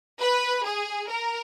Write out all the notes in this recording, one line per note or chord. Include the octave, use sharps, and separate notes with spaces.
B4
G#4
A#4